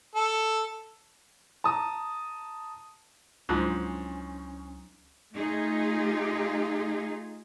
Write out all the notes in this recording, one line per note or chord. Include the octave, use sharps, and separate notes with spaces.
A4
A5 A#5 D#6
C#2 G#2 F3 F#3 C#4 D4 E4
A3 D#4 F4 G#4